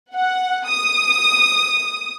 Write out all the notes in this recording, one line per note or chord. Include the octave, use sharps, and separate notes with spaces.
F#5
D#6